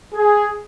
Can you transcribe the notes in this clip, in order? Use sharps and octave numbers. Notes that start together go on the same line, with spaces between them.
G#4